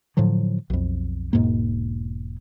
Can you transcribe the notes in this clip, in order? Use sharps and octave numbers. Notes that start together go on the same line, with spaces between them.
A2 D3 F3 F#3
B1 F2
E1 G#2 B2 A#3